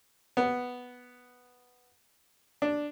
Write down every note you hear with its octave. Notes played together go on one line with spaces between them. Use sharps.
B3
D4